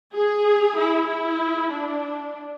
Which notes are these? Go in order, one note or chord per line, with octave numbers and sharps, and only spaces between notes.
G#4
E4
E4
D4